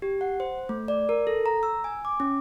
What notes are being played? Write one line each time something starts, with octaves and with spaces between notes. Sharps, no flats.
G4
F#5
C5
A3
D5
A#4
A4
A#5
E6
G#5
D6
C#4